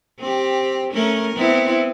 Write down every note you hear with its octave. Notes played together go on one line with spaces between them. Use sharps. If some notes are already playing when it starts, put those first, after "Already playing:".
C4 G4
A3 C#4 A#4
B3 C4 E4